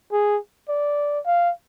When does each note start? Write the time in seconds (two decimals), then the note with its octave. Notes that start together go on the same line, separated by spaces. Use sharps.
0.13 G#4
0.69 D5
1.26 F5